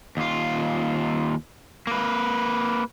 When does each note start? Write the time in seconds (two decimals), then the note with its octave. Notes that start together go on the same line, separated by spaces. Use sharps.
0.17 D#2 F4
1.87 A#3 B4